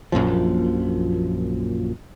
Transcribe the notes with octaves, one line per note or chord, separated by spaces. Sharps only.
A#1 F#2 A#2 F3